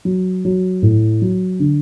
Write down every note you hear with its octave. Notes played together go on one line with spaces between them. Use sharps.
F#3
F#3
A2
F#3
D3